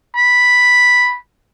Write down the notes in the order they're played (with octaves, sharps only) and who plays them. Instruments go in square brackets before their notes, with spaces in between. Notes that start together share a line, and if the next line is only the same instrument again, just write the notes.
[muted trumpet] B5